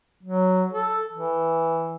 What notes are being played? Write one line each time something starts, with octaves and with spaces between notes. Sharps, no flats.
F#3
A4
E3